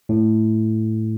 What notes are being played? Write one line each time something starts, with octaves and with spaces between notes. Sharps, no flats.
A2